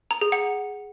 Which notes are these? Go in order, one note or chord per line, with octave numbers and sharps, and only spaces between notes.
A#5
G#4
F#5